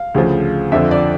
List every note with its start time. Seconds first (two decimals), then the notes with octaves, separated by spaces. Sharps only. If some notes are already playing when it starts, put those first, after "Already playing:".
Already playing: F5
0.14 D2 C#3 F3
0.72 F2 D3 F3 E5
0.91 D5